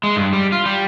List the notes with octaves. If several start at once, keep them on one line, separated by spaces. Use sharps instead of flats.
G#3
G2
G3
F4
G3